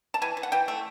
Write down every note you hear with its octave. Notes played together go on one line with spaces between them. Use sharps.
A5
E3 G#5
E3
F#5
E3 G5
A3